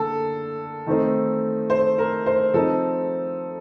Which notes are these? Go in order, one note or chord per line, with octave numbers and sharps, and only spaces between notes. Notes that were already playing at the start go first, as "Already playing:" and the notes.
Already playing: D3 A#3 A4
D#3 A3 C4 D#4
C5
A#4
C5
F3 C4 D#4 A4